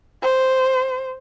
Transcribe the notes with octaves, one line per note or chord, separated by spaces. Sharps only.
C5